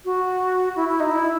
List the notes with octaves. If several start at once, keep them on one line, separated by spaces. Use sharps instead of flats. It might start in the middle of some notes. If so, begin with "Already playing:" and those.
F#4
E4
E4
D#4
E4